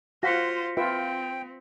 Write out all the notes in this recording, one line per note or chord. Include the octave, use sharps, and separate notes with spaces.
F4 F#4 C5 F5 F#5 A#6 B6 C#7
C4 F4 B4 E5 G5